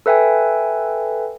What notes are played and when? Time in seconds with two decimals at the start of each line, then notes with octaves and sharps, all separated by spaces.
0.06 A4 B4 E5 G5 G#5